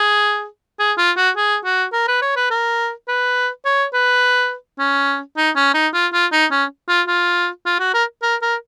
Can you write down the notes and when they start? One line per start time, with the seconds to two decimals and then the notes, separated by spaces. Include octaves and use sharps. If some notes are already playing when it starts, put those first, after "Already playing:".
Already playing: G#4
0.79 G#4
0.98 F4
1.17 F#4
1.37 G#4
1.65 F#4
1.93 A#4
2.08 B4
2.22 C#5
2.36 B4
2.50 A#4
3.08 B4
3.65 C#5
3.94 B4
4.79 C#4
5.37 D#4
5.56 C#4
5.74 D#4
5.94 F4
6.13 F4
6.32 D#4
6.51 C#4
6.89 F4
7.08 F4
7.66 F4
7.79 F#4
7.94 A#4
8.22 A#4
8.42 A#4